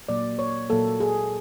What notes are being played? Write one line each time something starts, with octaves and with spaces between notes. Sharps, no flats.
A#2 F#3 A#3 D5
C#5
A#2 F#3 A#3 A4
G#4